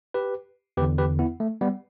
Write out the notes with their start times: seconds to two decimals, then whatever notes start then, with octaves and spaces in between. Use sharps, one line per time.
0.14 G4 B4
0.77 E2 D3 G4 B4
0.98 G4 B4
1.19 B3 E4
1.40 A3
1.61 G3 B3